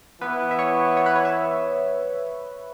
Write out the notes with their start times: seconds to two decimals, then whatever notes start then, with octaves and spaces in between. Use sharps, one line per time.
0.21 E3 B3 E4 B4
0.51 E5
0.59 C#5
0.97 C#5
1.06 B4
1.16 C#5
1.25 E5